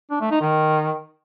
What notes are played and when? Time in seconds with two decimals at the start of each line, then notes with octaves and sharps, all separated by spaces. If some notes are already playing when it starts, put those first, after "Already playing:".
0.11 D4
0.21 A3
0.31 D#4
0.41 D#3